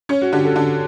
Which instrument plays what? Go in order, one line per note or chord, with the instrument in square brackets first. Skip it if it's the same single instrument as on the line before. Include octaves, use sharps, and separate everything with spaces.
[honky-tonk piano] C#4 [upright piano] C#5
[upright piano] F#4
[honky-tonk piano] D3 [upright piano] G4
[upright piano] A4
[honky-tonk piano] D3